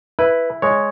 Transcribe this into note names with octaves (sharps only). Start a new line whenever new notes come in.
E4 B4
G#3 C#5